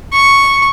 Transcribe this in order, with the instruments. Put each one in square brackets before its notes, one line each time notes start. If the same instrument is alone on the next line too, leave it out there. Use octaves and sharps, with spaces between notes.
[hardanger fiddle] C#6